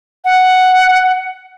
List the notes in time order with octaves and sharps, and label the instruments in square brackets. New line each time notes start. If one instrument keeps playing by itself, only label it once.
[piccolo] F#5